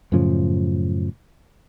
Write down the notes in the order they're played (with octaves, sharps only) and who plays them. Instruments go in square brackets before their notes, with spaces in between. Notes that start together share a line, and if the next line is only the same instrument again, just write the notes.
[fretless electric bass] F#2 A2 C#3 F3